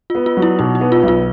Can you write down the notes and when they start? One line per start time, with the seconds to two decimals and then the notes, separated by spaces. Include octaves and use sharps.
0.10 F4
0.15 B3
0.26 F4
0.37 F#3
0.42 E4
0.59 B2 D#4
0.75 D#4
0.81 B3
0.92 F4
1.03 B1
1.08 F4